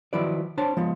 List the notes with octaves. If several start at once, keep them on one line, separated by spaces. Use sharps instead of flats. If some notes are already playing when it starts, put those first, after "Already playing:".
D#3 F3 F#3 E4 B4 D5
D4 C5 C#5 A5
F3 G#3 B3